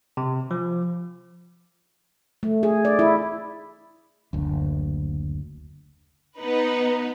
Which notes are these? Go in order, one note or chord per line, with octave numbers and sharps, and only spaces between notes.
C3
F3
A3
G#4
D5
E4
F#1 D2
B3 D#4 B4